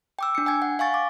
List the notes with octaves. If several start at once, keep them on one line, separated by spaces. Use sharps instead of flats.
G5 D6 E6
D4 C#7
G5 G#5 G#6
F#5
F5 G#5 C#6 A6
D6